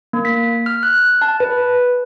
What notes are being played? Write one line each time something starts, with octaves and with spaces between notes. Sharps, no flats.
A#3
B6
F6
F#6
A5
B4